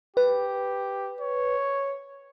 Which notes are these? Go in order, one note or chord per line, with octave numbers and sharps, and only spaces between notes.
G4 B4
C#5